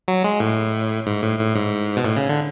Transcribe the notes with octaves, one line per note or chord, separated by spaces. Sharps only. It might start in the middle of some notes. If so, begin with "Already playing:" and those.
F#3
G#3
A2
G#2
A2
A2
G#2
B2
A2
C#3
D3